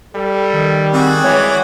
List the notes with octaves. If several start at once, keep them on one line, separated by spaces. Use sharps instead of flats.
G3 A4
D#3
C4 F#4 G#4 D5
E3 G#3 C#5